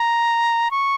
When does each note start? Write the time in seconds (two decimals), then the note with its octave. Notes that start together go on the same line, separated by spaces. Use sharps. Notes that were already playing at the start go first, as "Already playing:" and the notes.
Already playing: A#5
0.71 C#6